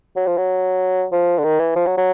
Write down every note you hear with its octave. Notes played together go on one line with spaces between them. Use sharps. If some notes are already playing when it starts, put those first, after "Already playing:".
F#3
F3
F#3
F3
D3
D#3
E3
F3
F#3
F#3